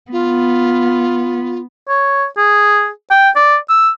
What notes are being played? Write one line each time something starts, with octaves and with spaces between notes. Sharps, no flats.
B3 F4
C#5
G#4
G5
D5
E6